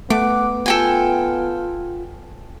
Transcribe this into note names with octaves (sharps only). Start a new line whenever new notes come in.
A3 B3 F#5 D6
F4 A4 G5 G#5